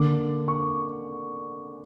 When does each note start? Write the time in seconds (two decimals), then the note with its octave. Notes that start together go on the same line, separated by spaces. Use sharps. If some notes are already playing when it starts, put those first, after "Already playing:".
Already playing: D3 A#3 D6
0.48 C#6